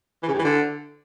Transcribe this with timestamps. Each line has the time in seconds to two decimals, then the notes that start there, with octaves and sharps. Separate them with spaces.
0.23 E3
0.28 C#3
0.33 G2
0.39 E3
0.44 D3